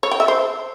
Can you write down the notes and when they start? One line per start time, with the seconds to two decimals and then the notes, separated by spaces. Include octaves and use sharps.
0.03 C#5
0.11 G5
0.20 E5
0.28 C5